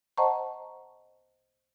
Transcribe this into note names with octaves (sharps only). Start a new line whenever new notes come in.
C5 D#5 F#5 A5 A#5 C#6